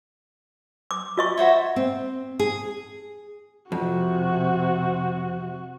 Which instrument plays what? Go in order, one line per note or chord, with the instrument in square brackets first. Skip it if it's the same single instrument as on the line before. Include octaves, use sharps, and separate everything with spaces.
[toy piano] D6
F4 D#5 C#6
[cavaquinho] F#4 C5 C#5 [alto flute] E5
[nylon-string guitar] C4
G#4
[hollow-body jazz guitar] F2 [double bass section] C3 [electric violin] F#4